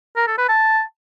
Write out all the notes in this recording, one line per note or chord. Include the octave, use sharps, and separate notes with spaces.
A#4
A4
B4
A5